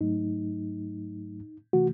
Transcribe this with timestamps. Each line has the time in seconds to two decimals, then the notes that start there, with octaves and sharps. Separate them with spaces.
0.01 G#2 F#3 A3 D#4
1.73 C3 E3 A3 F#4